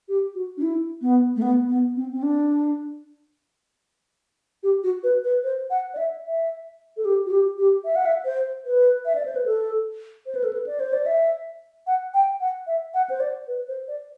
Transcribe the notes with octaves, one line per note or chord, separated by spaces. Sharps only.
G4
F#4
D4
E4
B3
A3
B3
B3
C4
C4
D4
G4
F#4
B4
B4
C5
F#5
D5
E5
E5
A4
G4
F#4
G4
G4
E5
F#5
E5
C5
B4
E5
D5
C5
B4
A4
C5
B4
A4
B4
D5
C5
D5
E5
F#5
G5
F#5
E5
F#5
C5
D5
B4
C5
D5